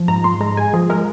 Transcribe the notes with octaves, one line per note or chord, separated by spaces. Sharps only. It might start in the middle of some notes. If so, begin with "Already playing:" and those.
Already playing: F3
G#2 A#5
G#2 C6
G#3 A#5
G#3 G#5
F3 G#4
G#3 A#4